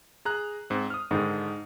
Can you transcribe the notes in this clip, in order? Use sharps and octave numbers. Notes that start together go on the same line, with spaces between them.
G#4 A#5 F#6
G#2 C4
D#6 F6
G#2 D3 D#3